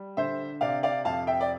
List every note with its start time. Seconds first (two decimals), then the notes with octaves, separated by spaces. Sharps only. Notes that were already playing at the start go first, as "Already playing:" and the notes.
Already playing: G3
0.17 D3 C5 E5
0.61 C3 D5 F5
0.83 D5 F5
1.05 F2 F5 A5
1.27 E5 G5
1.41 D5